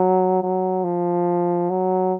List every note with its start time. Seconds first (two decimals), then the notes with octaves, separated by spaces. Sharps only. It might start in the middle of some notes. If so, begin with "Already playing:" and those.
Already playing: F#3
0.42 F#3
0.84 F3
1.70 F#3